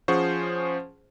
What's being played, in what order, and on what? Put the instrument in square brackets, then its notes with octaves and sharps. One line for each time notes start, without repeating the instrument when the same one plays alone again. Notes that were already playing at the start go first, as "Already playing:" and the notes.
[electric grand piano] F3 C#4 G#4 C5 F#5 C#6